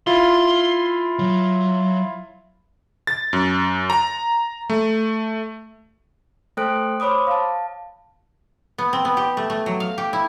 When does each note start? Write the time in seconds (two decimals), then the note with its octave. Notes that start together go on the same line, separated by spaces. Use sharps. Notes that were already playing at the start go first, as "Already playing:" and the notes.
0.07 E4 F4 C6
1.19 F#3
3.07 A6
3.33 F#2
3.90 A#5
4.70 A3
6.57 A3 A4 C5 G5 F#6 D7
7.00 C5 C#5 B5 D6 D#6
7.27 F5 A5
8.78 B3
8.93 C4
9.05 B3
9.17 G4
9.37 A3
9.50 A3
9.66 F#3
9.80 F5
9.98 G4
10.13 E4